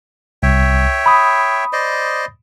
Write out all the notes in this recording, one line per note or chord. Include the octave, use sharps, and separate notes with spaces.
C2 C#5 E5 G5
B5 D#6
C5 D5 D#5